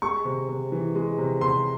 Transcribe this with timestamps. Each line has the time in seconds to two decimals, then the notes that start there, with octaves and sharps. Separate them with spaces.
0.02 G#3 C#6
0.25 C3
0.49 C3
0.72 E3
0.95 G#3
1.18 C3
1.41 C3 C6